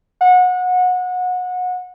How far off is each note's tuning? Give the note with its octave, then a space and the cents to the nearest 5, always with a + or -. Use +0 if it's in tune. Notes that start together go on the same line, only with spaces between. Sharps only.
F#5 -25